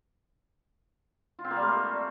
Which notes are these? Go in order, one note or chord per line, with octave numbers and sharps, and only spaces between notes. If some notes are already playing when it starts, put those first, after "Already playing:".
F4
C4
A#3
G3
A3